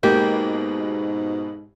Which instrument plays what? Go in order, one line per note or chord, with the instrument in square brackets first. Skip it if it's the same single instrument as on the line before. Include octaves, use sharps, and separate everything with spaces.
[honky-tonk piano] G#1 B2 G#3 [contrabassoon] G#2 [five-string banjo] A#3 [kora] G4